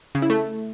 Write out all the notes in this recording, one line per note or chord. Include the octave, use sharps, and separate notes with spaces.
C#3
E4
A3